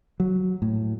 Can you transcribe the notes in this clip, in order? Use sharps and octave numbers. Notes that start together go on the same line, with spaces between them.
F#3
A2